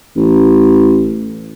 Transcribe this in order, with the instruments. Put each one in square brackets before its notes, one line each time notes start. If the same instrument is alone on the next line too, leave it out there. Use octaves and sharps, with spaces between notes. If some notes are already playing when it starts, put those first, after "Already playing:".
[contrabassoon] A1